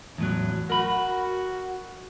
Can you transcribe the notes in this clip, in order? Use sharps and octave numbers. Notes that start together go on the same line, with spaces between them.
E2 A2 F#3
F#4 A#4 B5